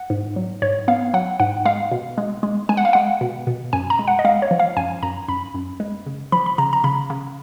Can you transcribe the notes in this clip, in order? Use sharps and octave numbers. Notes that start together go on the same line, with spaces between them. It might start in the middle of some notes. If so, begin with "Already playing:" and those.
Already playing: F#5
G#2
F#3
G#2 C#5
B3 F5
F#3 F#5
G#2 F#5
G#3 F5
B2
G#3
G#3
G#3 G#5
F#5
F5
G#3 F#5
B2
B2
F#2 G#5
A#5
G#3
F#5
D#5
G#3 F5
C#5
F3
F5
F#2 G#5
F#2 A#5
F#2 B5
F#2
G#3
C#3
F3 B5
B5
C#3 A#5
A#5
C#3 B5
C#3